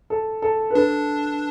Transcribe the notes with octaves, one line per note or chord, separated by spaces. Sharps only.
A4
A4
B4
D4 A4